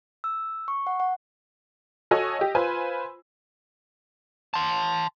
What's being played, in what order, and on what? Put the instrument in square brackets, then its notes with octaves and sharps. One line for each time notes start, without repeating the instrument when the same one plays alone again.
[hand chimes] E6
C#6
F#5
F#5
[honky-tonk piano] F#4 A4 C#5 D#5 G#5 E6
G4 D#5
F4 B4 C5 G#5 B5
[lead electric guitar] A5 C6